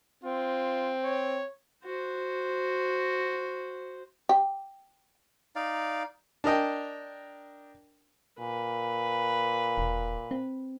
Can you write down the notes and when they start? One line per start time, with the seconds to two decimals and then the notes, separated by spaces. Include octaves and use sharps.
0.24 C4 F4
1.04 C#5
1.84 F#4 C5
4.29 G4
5.56 D#4 D5 F5
6.44 D4 A#4 D#5 G5
8.40 A#2 B4
9.78 E1
10.31 C4